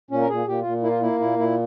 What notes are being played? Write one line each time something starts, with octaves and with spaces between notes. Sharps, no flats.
A#2 C#4
A#4
A#2 G#4
A#2 G4
A#2 F4
A#3 E4
F4
A#3 E4
A#2 E4
A#2 E4